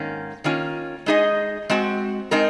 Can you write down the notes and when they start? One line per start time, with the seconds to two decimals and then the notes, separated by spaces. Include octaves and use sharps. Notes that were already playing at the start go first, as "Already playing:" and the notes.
Already playing: G#2 D#3 A#3 C#4
0.44 D#3 A#3 C#4 F4
1.06 G#3 D#4 G#4 D#5
1.70 G#3 C4 F#4
2.31 G#3 C4 D#4 A#4